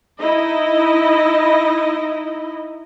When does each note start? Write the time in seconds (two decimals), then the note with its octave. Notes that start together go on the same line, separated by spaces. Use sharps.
0.19 D#4 E4 D#5